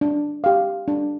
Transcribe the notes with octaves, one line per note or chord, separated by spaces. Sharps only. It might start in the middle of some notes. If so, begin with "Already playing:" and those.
D4
G4 F5
D4